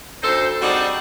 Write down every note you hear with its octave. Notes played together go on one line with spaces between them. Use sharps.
D2 D#4 A4 C5
G3 C4 D4 D#4 F#4 G#4